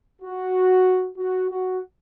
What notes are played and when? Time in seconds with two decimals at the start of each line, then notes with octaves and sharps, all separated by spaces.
0.22 F#4
1.17 F#4
1.50 F#4